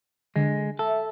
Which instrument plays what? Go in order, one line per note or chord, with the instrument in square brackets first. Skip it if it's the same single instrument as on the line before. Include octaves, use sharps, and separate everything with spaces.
[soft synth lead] D3 [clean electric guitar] G#3
[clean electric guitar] A4 [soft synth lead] E5